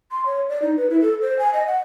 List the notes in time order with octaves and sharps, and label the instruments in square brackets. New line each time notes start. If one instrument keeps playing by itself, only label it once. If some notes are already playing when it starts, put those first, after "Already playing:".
[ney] C6
C#5
D5
D#4
B4
E4
A4
C5
G#5
D#5
F#5